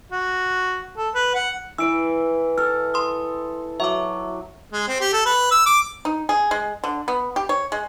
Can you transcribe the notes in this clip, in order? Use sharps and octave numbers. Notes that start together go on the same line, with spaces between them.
F#4
A4
B4
F#5
E3 E4 E6 D7
A4 F6
C6 D#6
F#3 E5 D6
G#3
C4
G4
A4
B4
E6
D6
D#4
G#4
G#3
D3
B3
G4
C#5
G#3